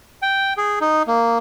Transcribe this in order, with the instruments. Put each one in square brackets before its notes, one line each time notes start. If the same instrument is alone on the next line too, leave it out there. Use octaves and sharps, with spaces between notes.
[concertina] G5
G#4
D#4
A#3